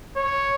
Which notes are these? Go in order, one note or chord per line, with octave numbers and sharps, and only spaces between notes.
C#5